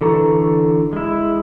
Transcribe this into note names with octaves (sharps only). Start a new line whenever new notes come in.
D3 E3 A4 A#5 C#6
G#3 E4